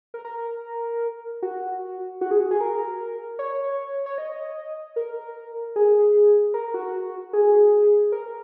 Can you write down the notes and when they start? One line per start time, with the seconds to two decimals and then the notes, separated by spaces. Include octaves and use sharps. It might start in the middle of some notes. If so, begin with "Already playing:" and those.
0.14 A#4
0.25 A#4
1.43 F#4
2.21 F#4
2.31 G#4
2.40 F#4
2.51 G#4
2.61 A#4
3.39 C#5
4.06 C#5
4.18 D#5
4.96 A#4
5.76 G#4
6.54 A#4
6.74 F#4
7.33 G#4
8.12 A#4